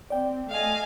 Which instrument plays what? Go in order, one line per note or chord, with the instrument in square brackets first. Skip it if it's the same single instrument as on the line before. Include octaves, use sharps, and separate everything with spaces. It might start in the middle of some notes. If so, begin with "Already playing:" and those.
[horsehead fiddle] C4 [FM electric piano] D5 G5
[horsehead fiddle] A3 D#5 [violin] F5 G#5